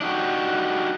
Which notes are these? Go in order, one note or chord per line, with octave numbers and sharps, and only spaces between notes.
D4 D#4 F#4 G4